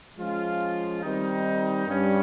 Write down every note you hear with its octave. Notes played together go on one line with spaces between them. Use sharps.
F3 G#3 C#4 F4
D#3 G3 C4 D#4
G2 G3 C#4